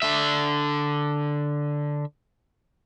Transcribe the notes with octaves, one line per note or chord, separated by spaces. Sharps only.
D3 E5